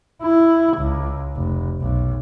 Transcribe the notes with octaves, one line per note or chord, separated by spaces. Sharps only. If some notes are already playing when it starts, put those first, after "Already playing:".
E4
C#2
F1
B1